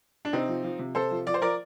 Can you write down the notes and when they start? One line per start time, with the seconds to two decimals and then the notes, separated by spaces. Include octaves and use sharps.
0.25 D4
0.33 C3 C4 D#4
0.48 F3
0.64 F3
0.79 C3
0.95 C3 A4 C5
1.11 F3
1.27 F3 D5
1.34 C5
1.41 F3 A#4 D5